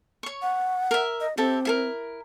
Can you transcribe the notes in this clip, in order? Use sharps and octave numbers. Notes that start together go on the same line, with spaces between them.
C#5 C#6
F#5
A#4 E5
D#5
C4 G4 A4 E5
E4 A4 A#4